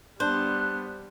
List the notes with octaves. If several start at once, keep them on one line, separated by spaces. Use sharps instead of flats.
G3 B3 D4 C5 D5 A5 F#6